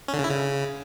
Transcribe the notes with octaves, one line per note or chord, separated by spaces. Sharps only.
C#4
D3
C#3
E4
C#3